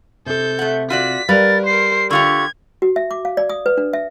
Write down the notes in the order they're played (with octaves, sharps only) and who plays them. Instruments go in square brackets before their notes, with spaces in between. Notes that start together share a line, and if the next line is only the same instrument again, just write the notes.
[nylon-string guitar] C3 [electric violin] A4 G6
[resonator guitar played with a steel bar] A3 F#5
[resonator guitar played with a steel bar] F4 F#4 D5 [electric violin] B6
[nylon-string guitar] G3 [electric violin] A#4 [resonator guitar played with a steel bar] B4 F5 [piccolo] A6
[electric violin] A#4 C5 [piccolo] C7
[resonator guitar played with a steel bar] D3 F4 G4 [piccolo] C#6 [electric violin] G#6
[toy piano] F#4
E5
D6
F5
D5
D#6
B4
D4
E5